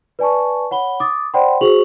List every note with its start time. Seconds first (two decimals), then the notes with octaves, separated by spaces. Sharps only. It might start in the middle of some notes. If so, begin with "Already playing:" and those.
0.19 B4 D5 G#5 A5 C#6
0.71 C#5 F#5 B5 G7
1.00 D6 D#6 A6
1.34 C5 D5 F#5 G5 B5 C6
1.61 F#4 G#4 C5 C#6 F7 F#7